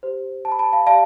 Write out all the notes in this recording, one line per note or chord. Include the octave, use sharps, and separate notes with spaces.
G4 C5
A5
B5
A5
B5
F5 A5
G4 D5 F5 A5